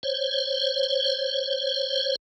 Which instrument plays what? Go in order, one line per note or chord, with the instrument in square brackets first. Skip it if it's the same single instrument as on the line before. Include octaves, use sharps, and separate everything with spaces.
[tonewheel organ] C5 C#5